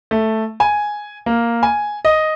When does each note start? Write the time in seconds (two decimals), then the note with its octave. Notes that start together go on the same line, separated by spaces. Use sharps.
0.11 A3
0.60 G#5
1.26 A#3
1.63 G#5
2.05 D#5